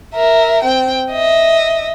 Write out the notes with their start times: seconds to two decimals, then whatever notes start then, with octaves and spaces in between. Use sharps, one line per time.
0.14 A#4 E5
0.63 C4 G5
1.12 D#5 E5